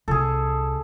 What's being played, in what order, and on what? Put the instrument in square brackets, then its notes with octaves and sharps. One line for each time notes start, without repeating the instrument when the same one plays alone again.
[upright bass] C2 [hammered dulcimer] G#4 A4